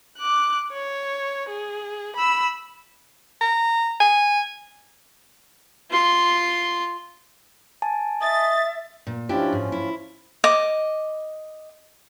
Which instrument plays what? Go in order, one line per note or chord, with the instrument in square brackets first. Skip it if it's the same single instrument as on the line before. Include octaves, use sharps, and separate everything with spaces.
[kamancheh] D6 F#6
C#5
G#4
B5 E6
[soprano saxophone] A#5
G#5
[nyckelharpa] F4 C6
[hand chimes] G#5 A5
[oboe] D#5 [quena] E5 [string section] A6
[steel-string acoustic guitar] A#2
[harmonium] F3 C#4 F4 [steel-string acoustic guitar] D4 E4 G4
[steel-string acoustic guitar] G#2
E4
[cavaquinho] D#5 D6